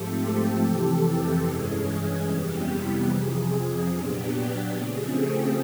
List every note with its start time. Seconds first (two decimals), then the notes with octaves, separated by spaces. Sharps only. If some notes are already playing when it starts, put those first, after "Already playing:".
Already playing: G#2 F3 A3 C4 G4 A4
0.61 F2 C3 E3 G4 A4
1.43 G2 E3 G#3 C#4 G#4
2.25 F2 C3 E3 G3 B3 G4
3.07 F2 C3 F3 G#4
3.89 A#2 F#3 B3 D4 G4
4.71 C#3 F3 A3 C4 G#4
5.13 G4 A4